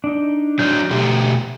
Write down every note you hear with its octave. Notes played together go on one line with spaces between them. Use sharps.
D4 D#4
F#3 D4 D#4 F6 G6
B2 A3 G4